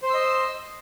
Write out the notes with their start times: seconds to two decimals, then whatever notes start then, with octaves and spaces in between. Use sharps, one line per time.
0.03 C5
0.06 C6
0.10 E6
0.14 D#5